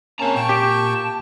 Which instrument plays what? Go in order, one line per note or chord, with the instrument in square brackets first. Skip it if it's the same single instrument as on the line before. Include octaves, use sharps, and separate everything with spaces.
[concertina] A#3 C#4 [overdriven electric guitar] C4 A#5 [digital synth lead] A5
[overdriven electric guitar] A#2 [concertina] G5 C#6
[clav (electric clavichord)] G4